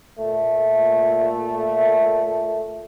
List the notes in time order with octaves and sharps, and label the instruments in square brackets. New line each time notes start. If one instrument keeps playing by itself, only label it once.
[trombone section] A#2 A3